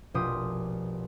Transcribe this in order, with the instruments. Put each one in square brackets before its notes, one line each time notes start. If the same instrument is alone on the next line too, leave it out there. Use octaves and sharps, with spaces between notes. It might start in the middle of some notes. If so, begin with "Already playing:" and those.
[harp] F1 A#1 B2 F4 G4 D#6